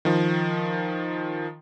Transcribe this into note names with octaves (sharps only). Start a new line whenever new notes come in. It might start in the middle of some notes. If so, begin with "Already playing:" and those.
D#3 F3